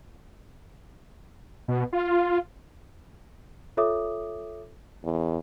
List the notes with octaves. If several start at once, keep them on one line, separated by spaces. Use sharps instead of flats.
B2
F4
F4 A4 C#5 E5 D6 D#6
E2